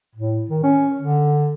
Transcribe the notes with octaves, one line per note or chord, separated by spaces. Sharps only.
A2
D#3
C#4
D3